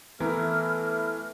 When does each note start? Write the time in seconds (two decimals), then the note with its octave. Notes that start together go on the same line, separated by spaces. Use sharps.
0.20 E3 A3 B3 E4 A#4 F6